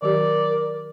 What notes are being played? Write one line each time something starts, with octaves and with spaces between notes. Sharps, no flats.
D#3 F#3 G4 A#4 D5